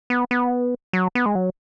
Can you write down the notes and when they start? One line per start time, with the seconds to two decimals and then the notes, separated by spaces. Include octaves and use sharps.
0.10 B3
0.31 B3
0.93 F#3
1.15 B3
1.26 G#3
1.35 F#3